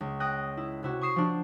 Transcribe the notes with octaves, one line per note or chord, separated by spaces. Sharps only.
C#2
G5 D#6 F#6 A#6
E4
C3 E4 F#4
C#6 D#6 C7 E7
F3 D4